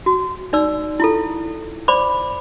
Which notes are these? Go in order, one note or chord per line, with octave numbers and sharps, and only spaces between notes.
F#4
D#4 D5 E6
E4 F4 A4
C5 D5 B5 D6